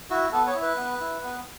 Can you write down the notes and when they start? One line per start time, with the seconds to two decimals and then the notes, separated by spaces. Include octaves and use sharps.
0.10 E4 F#4
0.32 B3 A4
0.47 C#5
0.55 E4
0.62 B4
0.77 B3
1.00 E4
1.23 B3